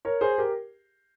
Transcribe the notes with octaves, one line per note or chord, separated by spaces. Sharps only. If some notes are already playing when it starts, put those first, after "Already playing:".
A#4 C#5
G#4 C5
G4 A#4